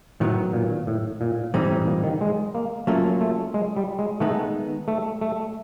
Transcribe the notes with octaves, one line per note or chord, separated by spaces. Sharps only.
A2 D#3 F#3 B3
A#2
A2
A#2
A2 E3 G3 C4 D#4
A2
A#2
D#3
G#3
A#3
F#3 A3 A#3 C#4 F4
A3
G#3
G3
G#3
D#3 G#3 A3 B3 D#4
A3
A3